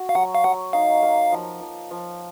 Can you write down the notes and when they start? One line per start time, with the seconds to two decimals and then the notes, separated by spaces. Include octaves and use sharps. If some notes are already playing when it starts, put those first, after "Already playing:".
Already playing: F#4
0.09 F5
0.15 F#3 F#5
0.35 F5
0.44 F#3 F#5
0.73 D#4 F5
1.02 A#3
1.32 F3
1.61 F3
1.91 F3